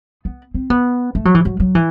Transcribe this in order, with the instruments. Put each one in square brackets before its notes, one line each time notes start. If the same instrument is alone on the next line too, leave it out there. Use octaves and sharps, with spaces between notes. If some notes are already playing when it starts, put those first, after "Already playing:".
[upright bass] B3
C4
B3
A3
F#3
E3
F#3
F#3
E3